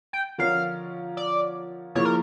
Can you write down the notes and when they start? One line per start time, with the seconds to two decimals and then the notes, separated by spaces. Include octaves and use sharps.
0.13 G5
0.38 D3 F3 C#4 F4 A#4 F5
1.17 D5
1.95 C#3 F3 A#3 E4 C#5
2.05 A#4